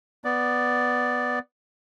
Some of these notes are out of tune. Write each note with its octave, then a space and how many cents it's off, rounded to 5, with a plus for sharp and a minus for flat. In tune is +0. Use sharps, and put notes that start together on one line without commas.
B3 +0 D5 +0